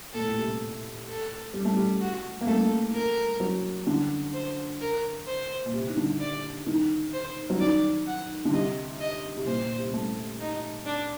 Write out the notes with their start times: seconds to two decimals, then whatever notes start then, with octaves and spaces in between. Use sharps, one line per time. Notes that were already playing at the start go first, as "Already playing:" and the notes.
0.13 A#2 A4
0.21 A2
0.28 A#2
0.37 C3
1.08 A4
1.54 G3
1.65 A3
1.76 G3
2.01 F#4
2.41 A#3
2.46 A3 A4
2.94 A#4
3.40 F#3
3.87 D3
4.33 C5
4.81 A#4
5.27 C5
5.66 A#2
5.73 C3
5.88 D#3
5.97 D3
6.20 D5
6.67 D#3
7.13 C5
7.50 F#3
7.60 D#3 D5
8.07 F#5
8.45 D3
8.53 C3 D#5
9.00 D#5
9.37 C3
9.46 A#2 C5
9.62 A#2
9.78 C3
9.93 A3
10.40 D#4
10.86 D4